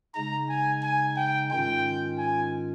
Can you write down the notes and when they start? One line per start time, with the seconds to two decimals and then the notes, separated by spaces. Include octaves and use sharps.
0.14 C#3 G#3 D#4 A#5
0.49 G#5
0.83 G#5
1.16 G5
1.51 G#2 D#3 G#3 C#4 F4 G5
2.18 G#5